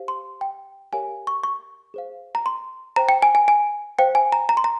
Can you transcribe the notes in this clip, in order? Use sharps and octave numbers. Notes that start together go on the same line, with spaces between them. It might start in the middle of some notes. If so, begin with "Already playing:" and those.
Already playing: G4 C5 F5
C6
G5
G4 A#4 C#5 F5 G#5
C#6
C#6
G#4 C5 F5
A#5
C6
C5 G5 A#5
G5
G#5
G#5
G#5
C5 F5 G5
G#5
A#5
A#5
C6
A#5